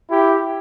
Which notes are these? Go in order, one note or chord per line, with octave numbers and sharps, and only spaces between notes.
E4 G4